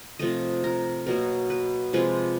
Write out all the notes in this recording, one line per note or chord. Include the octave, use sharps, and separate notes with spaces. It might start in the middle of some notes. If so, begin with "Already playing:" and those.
C3 F3 A3 D#5
A#4
B2 F#3 A#3 A#4
B4
C3 F3 G#3 B4